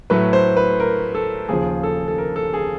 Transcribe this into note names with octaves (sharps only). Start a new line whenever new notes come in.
A2 F#3 A3 B4
C5
B4
A#4
A4
D#2 C#3 F3 G#4
A4
A4
A#4
A4
G#4